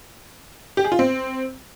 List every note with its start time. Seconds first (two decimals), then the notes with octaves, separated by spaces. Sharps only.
0.77 G4
0.84 G#4
0.92 F4
0.99 C4